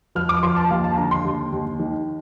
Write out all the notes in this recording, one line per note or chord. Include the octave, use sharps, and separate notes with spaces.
F3 F6
D6
F3 C6
A5
D#2 F5
A5
D3 A#5
C6
D#2
D#2
D#3